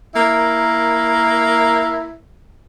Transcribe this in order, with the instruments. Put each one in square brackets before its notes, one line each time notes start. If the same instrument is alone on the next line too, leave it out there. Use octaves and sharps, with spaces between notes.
[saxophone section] A#3 E4 A#4